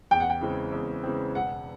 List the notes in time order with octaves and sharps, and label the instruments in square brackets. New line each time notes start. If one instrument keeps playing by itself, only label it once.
[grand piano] E2 [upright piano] G5
[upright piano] F#5
G5
[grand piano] C#3 E3 G#3 C4
E2
C#3 E3 G#3 C4
[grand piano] E1 [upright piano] F#5